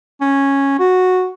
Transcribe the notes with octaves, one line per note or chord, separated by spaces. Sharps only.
C#4
F#4